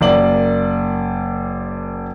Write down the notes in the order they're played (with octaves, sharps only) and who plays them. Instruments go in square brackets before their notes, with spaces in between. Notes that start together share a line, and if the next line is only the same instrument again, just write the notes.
[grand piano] F#1 A#3 D5 F#7